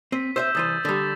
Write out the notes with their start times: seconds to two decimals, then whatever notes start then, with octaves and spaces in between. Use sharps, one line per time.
0.12 C4 B6 D#7
0.36 C5 D#5 E5 E6 G6 E7
0.55 C2 E3 C5 D#6 A6 D#7
0.85 D3 G3 D#6 A6 B6